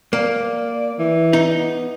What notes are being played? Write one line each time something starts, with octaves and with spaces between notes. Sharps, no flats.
A#3 D5
E3
D#4
B3